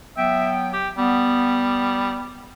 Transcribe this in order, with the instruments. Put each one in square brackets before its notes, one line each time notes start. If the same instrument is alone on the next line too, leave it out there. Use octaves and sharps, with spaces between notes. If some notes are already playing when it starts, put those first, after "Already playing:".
[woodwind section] F#3 B3 G5 [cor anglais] E5
[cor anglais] G4
[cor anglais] G3 [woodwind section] B3